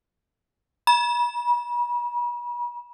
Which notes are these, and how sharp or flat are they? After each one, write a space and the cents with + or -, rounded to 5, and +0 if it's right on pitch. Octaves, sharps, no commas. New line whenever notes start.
B5 -40